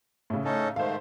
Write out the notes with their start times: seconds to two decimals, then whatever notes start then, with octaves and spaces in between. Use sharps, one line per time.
0.30 A2 C#3
0.44 C#4 D#4 A4
0.76 G#2 D#3 A3 C5 F5